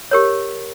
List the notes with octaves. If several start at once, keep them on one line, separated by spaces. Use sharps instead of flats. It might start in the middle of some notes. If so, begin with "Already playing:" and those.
G4 A#4 C#5